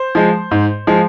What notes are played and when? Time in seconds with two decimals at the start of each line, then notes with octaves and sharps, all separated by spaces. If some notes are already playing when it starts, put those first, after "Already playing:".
Already playing: C5
0.15 F3 G#3
0.51 G#2
0.87 F3 G#3